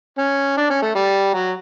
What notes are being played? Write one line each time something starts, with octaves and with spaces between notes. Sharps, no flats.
C#4
D4
C#4
A3
G3
F#3